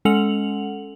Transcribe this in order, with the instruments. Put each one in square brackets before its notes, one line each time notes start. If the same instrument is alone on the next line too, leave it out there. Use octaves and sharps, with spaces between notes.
[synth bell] G#3 C#4 A4 F#5 F7 F#7